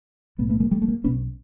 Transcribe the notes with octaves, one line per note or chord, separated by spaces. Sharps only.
B1 A2 A3 B3
A3 B3
G#3 A#3
G3 A3
A3
G#3 A#3
B1 B2 B3 C#4